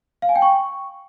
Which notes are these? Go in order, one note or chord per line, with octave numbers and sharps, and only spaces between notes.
F5
G#5
G5
C#6